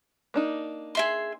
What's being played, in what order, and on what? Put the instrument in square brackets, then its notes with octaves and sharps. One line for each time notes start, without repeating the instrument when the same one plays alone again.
[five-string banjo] A#3 D4 D#4
[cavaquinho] G#4 E5 C6